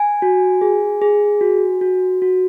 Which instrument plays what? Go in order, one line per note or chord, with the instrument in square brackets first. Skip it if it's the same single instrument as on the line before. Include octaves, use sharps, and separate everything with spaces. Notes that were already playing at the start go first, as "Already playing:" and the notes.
Already playing: [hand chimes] G#5
F#4
G#4
G#4
F#4
F#4
F#4